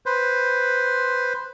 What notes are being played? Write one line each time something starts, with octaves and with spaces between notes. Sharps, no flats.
B4 C5